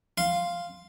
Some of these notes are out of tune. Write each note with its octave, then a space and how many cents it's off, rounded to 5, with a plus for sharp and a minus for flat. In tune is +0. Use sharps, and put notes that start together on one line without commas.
F5 +0 C6 +0